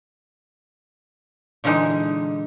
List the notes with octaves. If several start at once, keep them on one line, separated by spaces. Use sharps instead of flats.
A#2 D3 E3 G#3 D#4